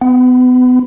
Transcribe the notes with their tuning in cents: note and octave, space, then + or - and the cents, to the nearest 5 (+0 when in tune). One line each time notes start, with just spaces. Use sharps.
B3 +30